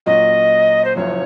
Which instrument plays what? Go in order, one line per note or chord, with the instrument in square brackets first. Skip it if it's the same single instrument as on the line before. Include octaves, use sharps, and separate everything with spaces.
[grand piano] A#2 F#3 C#4 [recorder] D#5
[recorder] C5
[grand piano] F#1 F#2 F3 [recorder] C#5